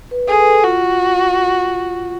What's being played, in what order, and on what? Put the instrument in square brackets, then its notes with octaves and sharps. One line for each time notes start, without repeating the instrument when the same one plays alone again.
[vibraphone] B4
[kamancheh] G#4 [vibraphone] A4
[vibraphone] B4
A4
[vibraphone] F4 [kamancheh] F#4